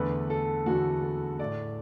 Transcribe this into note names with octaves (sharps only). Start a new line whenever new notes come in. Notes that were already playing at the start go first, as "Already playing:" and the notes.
Already playing: E2 D3 A3 B4
A4
E2 D3 A3 F#4
A4
A2 A3 D5